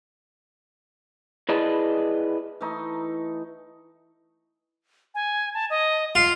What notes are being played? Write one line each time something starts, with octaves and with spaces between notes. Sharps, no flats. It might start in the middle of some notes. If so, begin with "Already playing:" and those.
E4 G#4 B4 D5 D#5 A5
E3 A3 D#4
G#5
A5
D#5
F4 C7